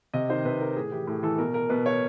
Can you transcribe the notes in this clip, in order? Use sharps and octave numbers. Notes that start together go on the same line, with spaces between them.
C3 D#5
D#3 C5
C3 B4
D#3 A#4
A2 G#4
E3 G4
A2 G#4
E3 A4
B2 A#4
A#4
B2 B4
C#5